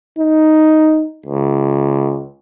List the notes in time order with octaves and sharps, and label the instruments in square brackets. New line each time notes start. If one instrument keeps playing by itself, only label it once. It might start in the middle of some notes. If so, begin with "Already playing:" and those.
[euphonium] D#4
C#2